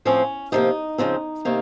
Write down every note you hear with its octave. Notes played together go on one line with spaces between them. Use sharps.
A2 F3 C4 C#4
C3 F3 A#3 D#4
C#3 F3 C4
C3 D#3 A#3